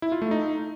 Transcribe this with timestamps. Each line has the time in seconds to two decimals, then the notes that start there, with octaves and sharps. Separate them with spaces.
0.02 E4
0.12 F4
0.22 A3
0.31 D#4